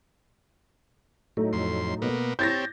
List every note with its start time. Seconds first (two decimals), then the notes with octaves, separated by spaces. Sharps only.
1.37 A2 F#3 A3 D#4
1.53 F2 C6
2.02 B2 A#3 B3
2.39 C4 G4 C#5 A5 G6 A6 A#6